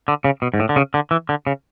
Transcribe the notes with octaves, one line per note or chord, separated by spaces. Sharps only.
D3
C#3
B2
G#2
A2
D3
C#3
D3
E3
D3
C#3